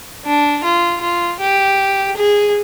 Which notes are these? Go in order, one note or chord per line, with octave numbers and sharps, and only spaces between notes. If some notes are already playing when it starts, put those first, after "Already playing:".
D4
F4
F4
G4
G#4